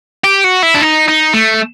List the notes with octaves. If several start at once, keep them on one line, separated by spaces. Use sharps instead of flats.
G4
F#4
E4
D4
D#4
D#4
A3